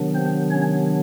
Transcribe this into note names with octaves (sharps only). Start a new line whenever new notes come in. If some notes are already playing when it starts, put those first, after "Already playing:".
Already playing: C3 D#3 F#3 B3 D4
C4 C5
C#4 C#5